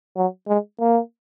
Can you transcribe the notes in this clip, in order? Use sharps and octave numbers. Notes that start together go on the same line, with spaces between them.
F#3
G#3
A#3